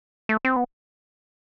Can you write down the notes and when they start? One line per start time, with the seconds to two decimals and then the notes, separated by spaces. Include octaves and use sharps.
0.29 A3
0.45 C4
0.56 B3